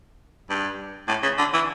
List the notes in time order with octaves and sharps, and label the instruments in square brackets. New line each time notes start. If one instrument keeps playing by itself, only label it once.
[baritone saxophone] G2
A2
C#3
D3
E3